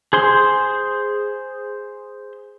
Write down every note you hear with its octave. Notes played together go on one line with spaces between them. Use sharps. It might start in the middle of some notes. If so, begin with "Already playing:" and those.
G#4 C5 C6